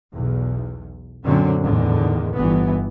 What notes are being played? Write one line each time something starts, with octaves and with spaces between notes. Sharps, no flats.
B1 E2
F#2 A#2 D3 F#3 C4 C#4
E2 A2 D3 D#3
G1 E3 B3